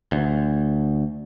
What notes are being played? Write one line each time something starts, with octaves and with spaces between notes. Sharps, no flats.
D2